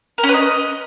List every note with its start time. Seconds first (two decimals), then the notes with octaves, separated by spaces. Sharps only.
0.18 A#4
0.23 C#4
0.29 B4
0.34 D#5